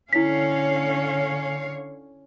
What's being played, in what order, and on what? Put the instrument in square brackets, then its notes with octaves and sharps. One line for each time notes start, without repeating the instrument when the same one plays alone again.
[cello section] D3 C#5 F5 [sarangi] C#4 [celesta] E4 B6